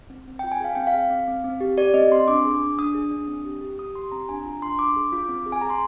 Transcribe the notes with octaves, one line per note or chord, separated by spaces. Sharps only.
C4
C4
F4 G5
G#5
G#4 F5
C4 G5
F5
G#4
C4
C4
C4
G4
G4 D5
C4 D#5
C4 C6
D4 D6
G#4
D4
D4 D#6
G#4
D4
C4
G4
G4
G4 D#6
G4 C6
C4 A#5
D4 G#5
F4 A#5
D4 C6
D4 D6
G#4
F4
C4
G#4
G#5
G#4 A#5
C6